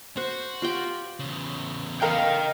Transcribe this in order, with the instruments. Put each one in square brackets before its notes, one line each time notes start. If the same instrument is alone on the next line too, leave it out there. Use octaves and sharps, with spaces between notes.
[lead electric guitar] F#4 [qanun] C5 F#5
[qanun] F4 G4 G5
[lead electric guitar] E2 C#3
[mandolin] A#4 F5 [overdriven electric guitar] D#5 G5